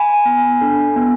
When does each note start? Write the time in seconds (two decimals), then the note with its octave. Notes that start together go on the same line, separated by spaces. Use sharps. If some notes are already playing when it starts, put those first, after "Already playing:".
Already playing: G#5 B5
0.25 B3
0.61 D4 A4
0.96 B3